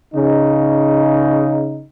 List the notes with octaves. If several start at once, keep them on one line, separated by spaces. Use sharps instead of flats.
C#3 D#4